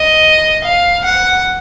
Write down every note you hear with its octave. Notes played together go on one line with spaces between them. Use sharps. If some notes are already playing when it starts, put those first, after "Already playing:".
Already playing: D#5
F5
F#5